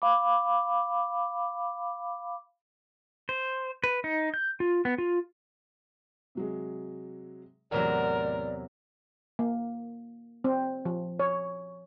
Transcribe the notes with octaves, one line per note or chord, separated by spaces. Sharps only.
F5 B5 D6
C5
B4
D#4
G6
F4
B3
F4
C3 F#3 G#3
E2 A2 C3 F#3 A#4 C#5 D5
A#3
C4
F3
C#5